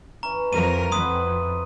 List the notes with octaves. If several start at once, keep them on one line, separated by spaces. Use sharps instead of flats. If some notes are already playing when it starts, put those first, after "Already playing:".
E3 C#4 A#5
F2 A#4 D#7
F2 E4 B4 F#5 C6 D#6